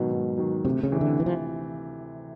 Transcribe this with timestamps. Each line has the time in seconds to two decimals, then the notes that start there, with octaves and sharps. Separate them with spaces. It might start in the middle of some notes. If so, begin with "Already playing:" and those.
Already playing: G#2 B2 D#3 F#3
0.11 G#2
0.37 D#3 F#3
0.65 D2 C3
0.83 C#3
0.92 C3 E3
1.01 D3
1.20 E3
1.26 F3